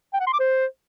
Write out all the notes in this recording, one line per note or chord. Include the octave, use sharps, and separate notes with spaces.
G5
F#5
C6
D6
C5